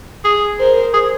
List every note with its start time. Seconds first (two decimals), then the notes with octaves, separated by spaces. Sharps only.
0.24 G#4
0.59 A#4 C5
0.94 G#4